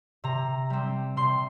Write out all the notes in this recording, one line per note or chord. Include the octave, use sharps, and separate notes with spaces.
C3 A#5
G3 C4
C3 C6